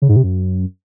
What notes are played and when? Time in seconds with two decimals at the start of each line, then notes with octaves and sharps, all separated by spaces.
0.02 C#3
0.09 G#2
0.16 C3
0.23 F#2